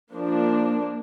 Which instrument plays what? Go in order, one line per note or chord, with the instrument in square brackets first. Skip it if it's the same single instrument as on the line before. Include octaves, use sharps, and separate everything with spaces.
[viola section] F3 A#3 D4